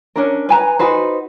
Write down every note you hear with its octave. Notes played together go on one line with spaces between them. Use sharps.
C#4 D4 A#4
B4 G#5 A#5
D#4 F#4 B4 C5